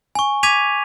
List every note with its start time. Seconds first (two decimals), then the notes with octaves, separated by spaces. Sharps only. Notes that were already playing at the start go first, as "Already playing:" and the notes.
0.15 G#5 C#6
0.43 D6 G#6 B6 D#7 F7